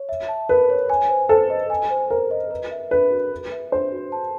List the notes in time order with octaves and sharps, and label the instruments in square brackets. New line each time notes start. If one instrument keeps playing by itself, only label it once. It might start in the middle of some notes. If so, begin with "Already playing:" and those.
Already playing: [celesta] C#5
E5
A5
[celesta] A#4 [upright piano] B4
[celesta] C#5
G#5
C5
[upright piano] A4 [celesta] C5
[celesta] D#5
G#5
C5
[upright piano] A#4 [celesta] C5
[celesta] D#5
B4
E5
[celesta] D4 [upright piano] B4
[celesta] F#4
B4
E5
[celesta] D4 [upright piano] C5
[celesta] F#4
A5